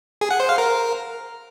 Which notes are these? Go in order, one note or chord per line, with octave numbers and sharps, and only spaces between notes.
G#4
F#5
C5
F5
A#4